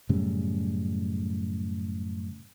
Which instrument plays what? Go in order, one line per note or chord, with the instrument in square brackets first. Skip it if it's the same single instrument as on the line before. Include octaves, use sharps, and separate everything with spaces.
[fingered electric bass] F#2 A2 C#3 G3